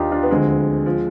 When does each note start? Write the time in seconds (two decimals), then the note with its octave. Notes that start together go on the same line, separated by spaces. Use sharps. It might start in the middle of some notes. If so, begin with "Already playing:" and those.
Already playing: D#2 D#3 D4 D#4 F4 G4
0.11 D4 F4
0.23 B3
0.30 D2 D3 F3 G#3 C4
0.86 F3